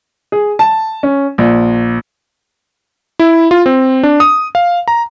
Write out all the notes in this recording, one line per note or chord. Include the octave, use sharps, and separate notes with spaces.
G#4
A5
C#4
A#1
E4
F4
C4
D4
D#6
F5
A#5